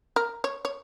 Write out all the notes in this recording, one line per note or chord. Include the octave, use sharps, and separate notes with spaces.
A#4
C#5
C#5